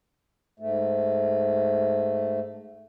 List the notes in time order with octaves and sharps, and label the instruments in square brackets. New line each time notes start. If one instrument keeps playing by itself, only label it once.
[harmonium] G#2 A3